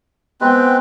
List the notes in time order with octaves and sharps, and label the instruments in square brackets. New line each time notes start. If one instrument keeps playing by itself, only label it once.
[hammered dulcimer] G#3 G5 [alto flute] B3 [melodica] C4 B4